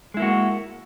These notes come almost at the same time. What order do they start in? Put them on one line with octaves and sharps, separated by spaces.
G#3 E4 A#3 F#4